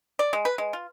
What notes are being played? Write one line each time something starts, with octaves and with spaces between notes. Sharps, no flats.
D5
G#3
B4
G#3
F4